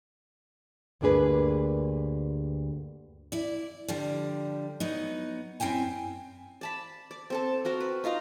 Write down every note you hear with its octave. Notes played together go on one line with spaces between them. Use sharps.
D2 G2 A#3 D4 G#4 B4
E4 D5
D3 F3 G3
F#3 B3 D#4
F#2 C4 E4 G5 G#5
D5 A5 B5
D5
C4 A4 A5
C4 F#4 A#4
B4
D#4 F4 F5 A#5